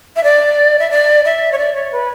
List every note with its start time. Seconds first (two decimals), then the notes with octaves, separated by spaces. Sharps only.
0.16 E5
0.24 D5
0.79 E5
0.91 D5
1.25 E5
1.52 C#5
1.58 D5
1.75 C#5
1.92 B4